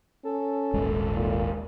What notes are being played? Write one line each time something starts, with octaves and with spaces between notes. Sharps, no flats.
C#4 A4
D#1 G#1 G#3
A#2